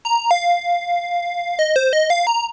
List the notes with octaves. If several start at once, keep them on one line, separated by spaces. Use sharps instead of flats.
A#5
F5
D#5
C5
D#5
F5
A#5